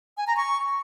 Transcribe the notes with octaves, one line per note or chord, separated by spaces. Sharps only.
G#5
A#5
C#6